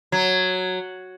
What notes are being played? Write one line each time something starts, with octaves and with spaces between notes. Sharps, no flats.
F#3